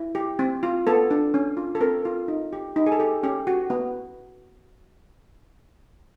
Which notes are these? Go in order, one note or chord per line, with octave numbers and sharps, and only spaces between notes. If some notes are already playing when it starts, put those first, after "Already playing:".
Already playing: E4
G4
C4
F4
B3 A4
D4
C#4
F4
A4
C4 A#4
F4
D#4
G4
D#4
G#4
A4
G4
C#4 G4
F#4
B3